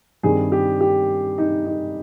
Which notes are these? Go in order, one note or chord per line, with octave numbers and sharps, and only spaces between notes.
G2 D#3 G3 C4 G#4
G4
G4
D#4
D#4